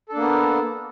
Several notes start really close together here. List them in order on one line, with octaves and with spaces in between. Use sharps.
A4 D4 A#3 B3